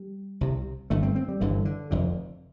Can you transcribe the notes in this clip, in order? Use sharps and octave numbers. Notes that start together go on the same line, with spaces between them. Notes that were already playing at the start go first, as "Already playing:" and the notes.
Already playing: G3
C2 C3
G1 G2 D3 A3
C4
C4
G3
G1 G2 D3 E3
D3
F1 F2 D3